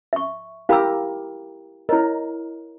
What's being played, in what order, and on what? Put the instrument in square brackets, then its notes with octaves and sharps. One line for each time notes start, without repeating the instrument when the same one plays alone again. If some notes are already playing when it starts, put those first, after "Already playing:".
[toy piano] E5 C#6
[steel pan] E4 G4 A#4 [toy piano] F5 B5 E6
[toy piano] E4 C#5 D#5 [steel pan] A#4